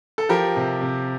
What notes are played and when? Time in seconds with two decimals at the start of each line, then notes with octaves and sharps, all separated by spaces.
0.18 A4
0.29 F3 G4 A#4
0.56 C3
0.81 C3